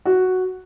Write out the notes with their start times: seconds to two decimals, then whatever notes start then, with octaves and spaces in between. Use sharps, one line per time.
0.05 F#4